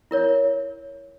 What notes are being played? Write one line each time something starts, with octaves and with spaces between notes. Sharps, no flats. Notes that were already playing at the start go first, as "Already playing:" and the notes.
E4 A#4 C#5